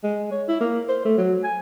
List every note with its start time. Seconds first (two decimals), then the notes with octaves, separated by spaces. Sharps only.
0.03 G#3
0.31 C#5
0.48 E4
0.60 A#3
0.89 C5
1.05 A3
1.18 F#3
1.44 G#5